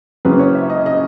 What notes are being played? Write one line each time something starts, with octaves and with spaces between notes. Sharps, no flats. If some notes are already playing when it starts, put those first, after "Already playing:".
F#1 F#2 C#3 B4
C#5
E5
D#5
D#5